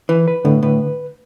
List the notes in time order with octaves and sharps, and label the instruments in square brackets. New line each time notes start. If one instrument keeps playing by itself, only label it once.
[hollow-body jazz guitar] E3 [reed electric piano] B4
[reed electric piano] B4
[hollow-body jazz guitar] A2 [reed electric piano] D3
[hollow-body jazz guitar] A2 [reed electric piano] B4